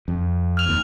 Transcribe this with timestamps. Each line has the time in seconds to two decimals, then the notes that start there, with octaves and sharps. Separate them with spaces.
0.08 F2
0.57 F6 F7
0.69 D#2